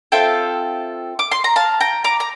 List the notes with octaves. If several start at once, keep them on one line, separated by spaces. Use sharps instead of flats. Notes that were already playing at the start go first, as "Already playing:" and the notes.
C4 F4 A4 E5 G5
D6
C6
A#5
F5 A5
G5 A#5
A#5 D6
A#5